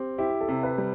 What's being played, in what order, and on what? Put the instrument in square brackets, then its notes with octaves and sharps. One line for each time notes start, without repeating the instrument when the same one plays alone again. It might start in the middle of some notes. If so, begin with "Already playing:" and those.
Already playing: [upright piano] C4 [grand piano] G4
[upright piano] E4 [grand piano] G4
[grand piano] A4
[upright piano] C3
[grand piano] B4
[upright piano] G3